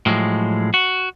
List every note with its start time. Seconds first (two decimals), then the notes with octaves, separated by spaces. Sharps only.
0.06 A2 F3 F#3 G#3
0.74 F#4